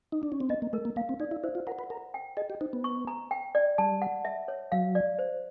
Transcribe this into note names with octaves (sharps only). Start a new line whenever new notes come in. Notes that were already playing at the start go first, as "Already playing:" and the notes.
D#4
D4
C#4
C4
B3 D#5
A#3
A3 A#4
A#3
A#3 F5
C4
D#4 D5
E4
E4 C5
F4
A#4 F#5
B4
A#4 A#5
G5
G#4 D#5
G4
D#4 C5
B3
C#6
A#5
G5
D5
G3 A5
F#5
E5
C#5
F#3 F5
D5
C5